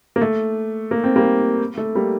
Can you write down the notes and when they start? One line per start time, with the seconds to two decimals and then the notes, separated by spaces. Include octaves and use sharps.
0.16 A#3
0.21 A3
0.91 A#3
1.04 C4
1.16 G3 A#3
1.78 A3
1.95 G3 A#3